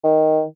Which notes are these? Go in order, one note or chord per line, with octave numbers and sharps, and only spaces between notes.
D#3